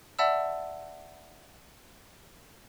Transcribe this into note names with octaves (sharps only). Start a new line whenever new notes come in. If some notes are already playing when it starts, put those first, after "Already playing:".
D5 E5 F#5 A5 B5 E6